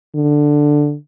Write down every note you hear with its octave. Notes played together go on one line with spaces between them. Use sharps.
D3